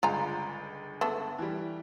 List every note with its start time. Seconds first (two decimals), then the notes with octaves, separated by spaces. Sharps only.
0.03 G1 C#2 F4 G#5 A#5
1.01 A3 B3 A4
1.38 E3 G3